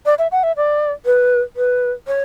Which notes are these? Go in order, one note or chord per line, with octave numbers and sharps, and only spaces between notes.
D5
E5
F#5
E5
D5
B4
B4
C#5